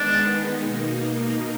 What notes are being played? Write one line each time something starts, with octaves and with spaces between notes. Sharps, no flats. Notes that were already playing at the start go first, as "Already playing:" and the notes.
Already playing: D#3 G#3 B3 D4 D#4
B2 A#3 D#4